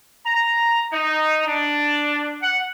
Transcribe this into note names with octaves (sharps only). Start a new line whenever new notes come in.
A#5
D#4
D4
F#5